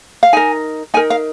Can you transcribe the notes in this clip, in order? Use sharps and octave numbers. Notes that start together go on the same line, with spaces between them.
F5
D#4 A#4 G#5
D#4 A#4 G#5
F5